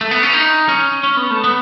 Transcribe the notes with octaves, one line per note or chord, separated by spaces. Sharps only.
A3
B3
C#4
D#4
C#4
C#4
B3
A3
B3